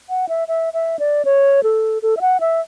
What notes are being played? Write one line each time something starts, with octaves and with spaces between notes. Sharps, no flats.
F#5
E5
E5
E5
D5
C#5
A4
A4
E5
F#5
E5